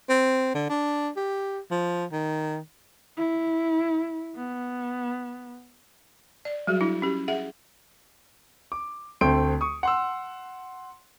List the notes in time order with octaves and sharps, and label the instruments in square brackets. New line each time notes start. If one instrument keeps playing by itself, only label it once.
[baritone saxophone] C4
D3
D4
G4
F3
D#3
[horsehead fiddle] E4
B3
[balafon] D5
F#3 G3 F#4 G#4
D4 E4
C#4 G4
G#4 E5 F#5
[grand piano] D6
D2 A3 C4 G5 C6 D7
C#6 D#6
F#5 C6 E6